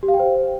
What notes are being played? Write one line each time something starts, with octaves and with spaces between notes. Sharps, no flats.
G4
F5
G5
C5